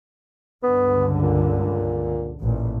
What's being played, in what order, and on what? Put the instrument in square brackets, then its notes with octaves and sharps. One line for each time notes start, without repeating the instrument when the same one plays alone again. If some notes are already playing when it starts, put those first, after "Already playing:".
[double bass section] C#2 G2 D3 [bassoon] B3
[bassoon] A#2
[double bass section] A1 A#2